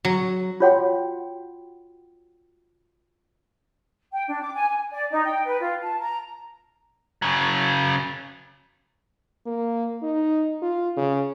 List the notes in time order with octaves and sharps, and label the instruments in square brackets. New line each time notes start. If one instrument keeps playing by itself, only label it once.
[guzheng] F#3
[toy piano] F4 F#4 C#5 F#5 G5 C6
[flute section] G5
D4
D6
G#5
G#5
D5
D#4
G5
B4
F4
A5
A#5
[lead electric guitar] C#3 F#3
[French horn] A#3
D#4
F4
C#3